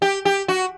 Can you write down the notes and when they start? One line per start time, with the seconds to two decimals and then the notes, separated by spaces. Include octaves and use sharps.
0.02 G4
0.25 G4
0.48 F#4